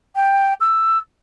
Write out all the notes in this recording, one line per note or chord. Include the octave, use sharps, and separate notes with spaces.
G5
E6